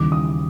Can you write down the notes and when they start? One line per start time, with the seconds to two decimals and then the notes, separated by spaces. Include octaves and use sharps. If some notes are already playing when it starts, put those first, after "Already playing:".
Already playing: D#2 C#3 E3 G3 D6
0.12 D#6